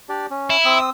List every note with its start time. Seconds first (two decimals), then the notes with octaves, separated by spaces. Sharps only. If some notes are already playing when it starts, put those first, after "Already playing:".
0.09 D4 G4 D5
0.30 C#4
0.50 E4
0.65 C4 D#6 E6